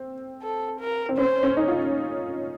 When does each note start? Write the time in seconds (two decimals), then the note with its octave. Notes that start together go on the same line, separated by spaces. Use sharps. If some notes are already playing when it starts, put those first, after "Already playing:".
Already playing: C4
0.42 A4
0.80 A#4
1.09 C4
1.18 C#4 C5
1.43 C#4
1.57 D#4
1.68 F4